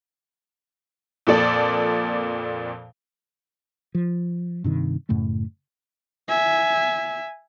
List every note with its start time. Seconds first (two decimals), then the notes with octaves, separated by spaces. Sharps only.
1.27 F2 A#2 A4 D5
3.95 F3
4.64 G2 C3 D#3
5.09 F#2 A2 C#3 A3
6.28 E5 G#5